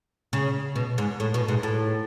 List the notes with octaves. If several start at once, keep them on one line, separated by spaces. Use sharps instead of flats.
C#3
B2
G#2
A2
B2
G#2
A2